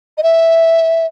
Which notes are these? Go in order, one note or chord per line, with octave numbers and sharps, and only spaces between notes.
D#5
E5